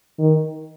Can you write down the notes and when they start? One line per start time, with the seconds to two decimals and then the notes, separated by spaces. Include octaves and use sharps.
0.19 D#3